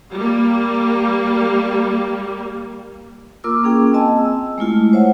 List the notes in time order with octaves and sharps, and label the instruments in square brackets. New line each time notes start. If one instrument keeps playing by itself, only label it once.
[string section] G3 A#3
[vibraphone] A#3 F4 A#4 D6 E6
A#3 C#4 G#4 G5
C4 D#5 G#5 A5
E6
G#3 A3 E4 F4
C5 C#5 E5 F#5